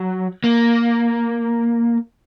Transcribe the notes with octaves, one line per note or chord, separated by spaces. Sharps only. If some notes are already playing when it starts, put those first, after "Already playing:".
Already playing: F#3
A#3